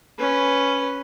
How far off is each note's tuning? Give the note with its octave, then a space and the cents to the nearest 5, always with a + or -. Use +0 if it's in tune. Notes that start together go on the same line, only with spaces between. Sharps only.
C#4 +0 B4 +0